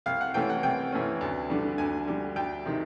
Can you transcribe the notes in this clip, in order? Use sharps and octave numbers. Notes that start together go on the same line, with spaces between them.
C2 F5
F#5
C3 E3 A3 C#4 G5
F#5
C2 G5
C3 E3 A3 C#4
D2
D3 G3
D2 G#5
D3 G3
D2 G5
C3 D#3